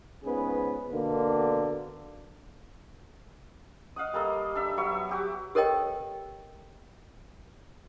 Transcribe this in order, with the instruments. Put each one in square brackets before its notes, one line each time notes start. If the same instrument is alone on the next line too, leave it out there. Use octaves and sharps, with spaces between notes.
[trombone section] C#2 G#2 B3 C#4 G#4 B4
B2 D3 A#3
[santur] D#5 F5 F#5 D#6
G3 A#3 A4 D#5
D4 E5
F#3 B3 E5 C#6
F#4 G4 D6
[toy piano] G4 A4 A#4 C#5 D#5 G5